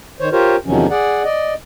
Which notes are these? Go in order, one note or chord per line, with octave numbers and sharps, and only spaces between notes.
D#3 C5 C#5
F4 G4 A#4 C5 C#5
E2 C3 D#3 F3 F#3 C#4
G#4 D5 F#5
D5 D#5